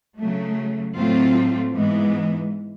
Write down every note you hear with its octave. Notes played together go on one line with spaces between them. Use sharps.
C#3 F#3 A3
A2 F#3 A3 C4 F4
G#2 E3 G#3 B3